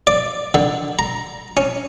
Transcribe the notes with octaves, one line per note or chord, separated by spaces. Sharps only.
D5
D3
A#5
C#4